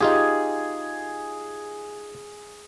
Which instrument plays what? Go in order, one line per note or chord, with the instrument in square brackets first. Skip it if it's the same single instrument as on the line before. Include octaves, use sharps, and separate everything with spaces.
[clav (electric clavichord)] D#4 F4 G4 [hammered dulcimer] G#4